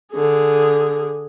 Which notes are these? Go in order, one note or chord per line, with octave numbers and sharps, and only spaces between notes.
D3 G#4